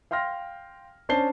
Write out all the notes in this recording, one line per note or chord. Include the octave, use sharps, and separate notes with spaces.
F5 G5 C6 F6 A#6
C#4 D4 C5 A5 C7 G7